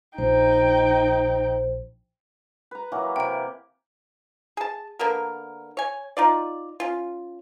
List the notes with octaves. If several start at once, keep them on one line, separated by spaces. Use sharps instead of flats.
A#1 D#4 C5 G5
B4 A#5
E3 F#3 A#3
C3 G5 D7
G#4 A5
D3 A#3 B3 A#4
C#5 G#5
D#4 F4 D5
C#4 F4